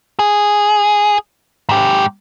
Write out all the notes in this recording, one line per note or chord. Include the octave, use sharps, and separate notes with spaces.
G#4
G#2 G4